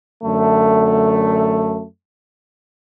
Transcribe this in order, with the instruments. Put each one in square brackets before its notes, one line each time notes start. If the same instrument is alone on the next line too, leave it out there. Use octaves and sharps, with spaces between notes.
[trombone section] F#2 D3 A3